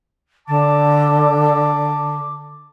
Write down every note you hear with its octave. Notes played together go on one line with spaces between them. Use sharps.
D3 A5 D6